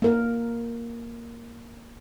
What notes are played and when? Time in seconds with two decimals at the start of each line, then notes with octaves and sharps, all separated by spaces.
0.02 A#3 A#4